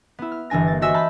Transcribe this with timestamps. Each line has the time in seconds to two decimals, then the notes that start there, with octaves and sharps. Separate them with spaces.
0.19 B3 E4
0.32 F6
0.50 G1 E3 D4 G#5 A#6
0.67 A#3 A6
0.81 F#4 C5 D#5 E5 G#5
0.94 E5 A5 B5 F6 G6 B6